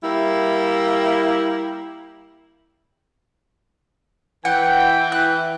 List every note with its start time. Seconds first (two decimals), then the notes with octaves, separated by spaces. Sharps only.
0.03 G3 A#3 E4
4.45 E3 F#5 G5
5.12 F#6